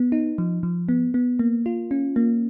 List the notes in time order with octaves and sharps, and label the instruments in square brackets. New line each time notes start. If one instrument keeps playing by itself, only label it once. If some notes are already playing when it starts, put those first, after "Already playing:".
Already playing: [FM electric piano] B3
D#4
F3
F3
B3
B3
A#3
F4
C#4
A#3